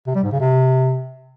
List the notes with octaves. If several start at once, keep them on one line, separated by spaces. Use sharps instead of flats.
C3
G3
G#2
C#3
C3